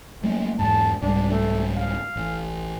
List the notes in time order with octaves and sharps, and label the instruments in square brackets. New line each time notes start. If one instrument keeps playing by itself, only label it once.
[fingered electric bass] F#3 A3 A#3
[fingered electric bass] E2 G#2 [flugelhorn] A5
[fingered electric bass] C2 G#2 G3 [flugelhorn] D4
[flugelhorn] A3
F5
[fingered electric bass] A1